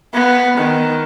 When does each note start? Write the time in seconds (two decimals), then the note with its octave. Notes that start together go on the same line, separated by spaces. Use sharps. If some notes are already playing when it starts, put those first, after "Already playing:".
0.14 B3
0.57 D#3